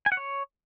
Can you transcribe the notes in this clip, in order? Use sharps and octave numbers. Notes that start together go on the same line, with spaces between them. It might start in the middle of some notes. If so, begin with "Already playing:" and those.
G#5
F#5
C#5